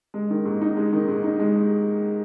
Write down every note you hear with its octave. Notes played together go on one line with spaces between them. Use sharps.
G#3
D#3
G#2
D#4
G#3
D#3
G#2
D#4
G#3